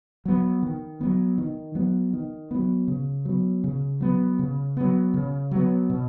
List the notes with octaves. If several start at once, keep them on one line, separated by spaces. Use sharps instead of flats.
F#3 B3
D#3
F#3 B3
D#3
F#3 B3
D#3
F#3 B3
C#3
F#3 B3
C#3
F#3 B3
C#3
F#3 B3
C#3
F#3 B3
B2